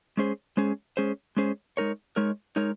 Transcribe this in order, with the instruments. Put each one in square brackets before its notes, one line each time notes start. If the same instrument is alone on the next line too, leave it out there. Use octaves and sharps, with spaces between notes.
[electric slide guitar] G#3 C#4 G#4 C5
G#3 C#4 G#4 C5
G#3 C#4 G#4 C5
G#3 C#4 G#4 C5
G#3 D#4 A#4 C#5
G#3 D#4 A#4 C#5
G#3 D#4 A#4 C#5